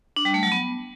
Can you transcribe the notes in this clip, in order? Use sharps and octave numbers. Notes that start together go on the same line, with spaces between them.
D4
G3
A3
F#3
B3